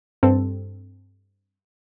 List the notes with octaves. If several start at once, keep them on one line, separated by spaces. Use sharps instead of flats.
G2 C4 A4